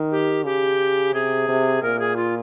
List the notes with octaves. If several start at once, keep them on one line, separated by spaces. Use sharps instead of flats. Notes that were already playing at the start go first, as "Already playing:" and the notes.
Already playing: D#3
G4
C#3 G4
C3 G#4
C3
A#2 A#4
G#4
F4